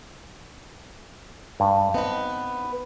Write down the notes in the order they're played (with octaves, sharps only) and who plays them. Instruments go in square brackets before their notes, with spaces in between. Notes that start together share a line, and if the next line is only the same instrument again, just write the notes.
[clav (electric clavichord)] G2
[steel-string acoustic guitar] B3 B4 [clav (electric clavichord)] C4 D#4